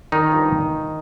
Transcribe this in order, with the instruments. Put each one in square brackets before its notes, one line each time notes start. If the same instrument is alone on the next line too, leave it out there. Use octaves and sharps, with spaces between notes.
[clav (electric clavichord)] D#3 D#4
G2 F3